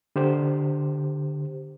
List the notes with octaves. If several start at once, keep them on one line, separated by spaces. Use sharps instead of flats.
D3 G4 C5